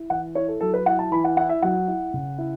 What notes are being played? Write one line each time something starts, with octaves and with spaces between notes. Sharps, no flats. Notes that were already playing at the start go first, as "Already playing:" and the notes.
Already playing: E4
E3 F#5
E4 C#5
A4
F#3 A4
B4
E4 F#5
A5
E3 B5
F#5
E4 F#5
E5
F#3 F#5
E4
C#3
E4